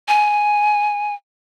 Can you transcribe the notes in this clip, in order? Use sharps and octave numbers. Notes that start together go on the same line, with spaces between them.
G#5